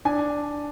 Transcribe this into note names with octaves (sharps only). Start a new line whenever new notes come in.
D4 G#5